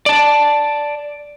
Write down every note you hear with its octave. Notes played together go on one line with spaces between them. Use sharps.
D5 A5